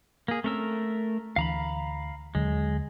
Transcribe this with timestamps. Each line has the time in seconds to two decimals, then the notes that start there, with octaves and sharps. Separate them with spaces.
0.28 A#3 G#4
0.44 A3 C4 C#4 A#4 E6
1.36 D2 E3 D4 F5 A#5 B5
2.35 D#2 D3 F#3 G#3